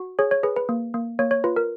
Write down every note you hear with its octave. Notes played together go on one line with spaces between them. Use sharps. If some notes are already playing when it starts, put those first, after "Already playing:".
Already playing: F#4
G#4 C#5
C#5
G#4 B4
B4
A#3
A#3
A#3 C#5
C#5
F4 B4
A#4